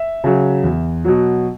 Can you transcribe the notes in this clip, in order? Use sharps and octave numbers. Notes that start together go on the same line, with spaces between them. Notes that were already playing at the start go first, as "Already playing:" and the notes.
Already playing: E5
C#3 F#3
E2
B2 F#3